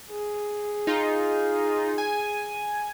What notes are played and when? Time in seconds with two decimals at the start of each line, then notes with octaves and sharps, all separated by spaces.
0.11 G#4
0.87 D#4 F4
1.98 G#5